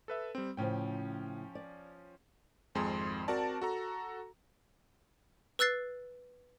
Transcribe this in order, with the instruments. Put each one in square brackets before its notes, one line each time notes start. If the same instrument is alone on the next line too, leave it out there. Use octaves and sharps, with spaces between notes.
[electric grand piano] A4 B4 E5
G3 C4
[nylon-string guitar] A2 C#3 C5 [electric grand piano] F3 C#4 G5
[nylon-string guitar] D5
[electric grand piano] G#1 F2 G#3 G#4 C6
C4 F#4 A#4 D5 A5
F#4 A4 A#5
[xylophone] B4 E6 F#6 A6 C7